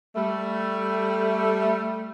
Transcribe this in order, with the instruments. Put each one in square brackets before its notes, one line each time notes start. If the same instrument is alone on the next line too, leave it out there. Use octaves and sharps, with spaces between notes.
[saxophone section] G3 A3